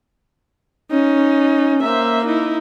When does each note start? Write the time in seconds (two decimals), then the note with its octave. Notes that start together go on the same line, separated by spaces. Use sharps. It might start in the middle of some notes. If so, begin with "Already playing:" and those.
0.91 C#4 D#4
1.83 A#3 C5 E5
2.25 D#4 E4